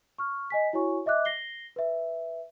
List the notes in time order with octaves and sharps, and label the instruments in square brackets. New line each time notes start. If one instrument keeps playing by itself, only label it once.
[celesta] C#6 F6
D#5 G#5 B6
E4 F#4 C#5 G#5 C#6
D#5 E5 D6 F#6
A#6 C7 G7
B4 E5